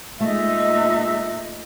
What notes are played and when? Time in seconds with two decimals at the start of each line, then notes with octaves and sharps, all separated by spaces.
0.20 A#2 G#3 A3 D#4 E5